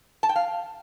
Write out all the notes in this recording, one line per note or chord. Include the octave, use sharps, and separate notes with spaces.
A5
G5
F5